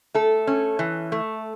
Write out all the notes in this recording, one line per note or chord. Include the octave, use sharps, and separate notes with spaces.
A3 A4
C#4
E3
A3